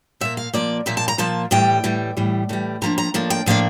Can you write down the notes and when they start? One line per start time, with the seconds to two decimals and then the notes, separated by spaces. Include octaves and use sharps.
0.21 A#2 F3 A#3 E5
0.37 F5
0.53 A#2 F3 A#3 D5
0.86 A#2 F3 A#3 E5
0.97 A5
1.08 A#5
1.18 A#2 F3 A#3 A5
1.51 A2 E3 G3 G5
1.84 A2 E3 G3
2.17 A2 E3 G3
2.49 A2 E3 G3
2.82 A2 F3 A#3 D4 A#5
2.98 A#5
3.14 A2 F3 A#3 D4
3.30 G5
3.46 A2 F3 A#3 D4 F5